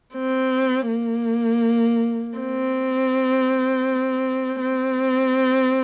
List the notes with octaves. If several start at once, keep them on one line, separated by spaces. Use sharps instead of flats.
C4
A#3
C4
C4